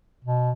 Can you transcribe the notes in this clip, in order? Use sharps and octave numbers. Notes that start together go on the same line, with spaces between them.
B2